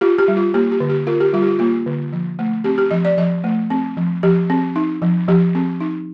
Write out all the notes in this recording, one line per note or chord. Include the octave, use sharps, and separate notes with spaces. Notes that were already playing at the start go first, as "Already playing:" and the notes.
F4 G4
G4
G3
F4
A#3 G4
G4
D3
G4
F4 A#4
G4
G3 F4
G4
F4
A#3 F4
D3
F3
A3
C4 G4
G4
F3 D#5
D5
F3 D#5
A3
C4
F3
F3 G4
C4
D#4
F3
F3 G4
C4
D#4